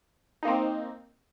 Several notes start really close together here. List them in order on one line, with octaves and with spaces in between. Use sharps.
D#4 A#3 C4